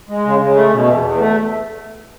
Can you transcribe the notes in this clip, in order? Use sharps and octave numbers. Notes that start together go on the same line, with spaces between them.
G#3
C#3
C#3
A3
B2
E2
E2
A3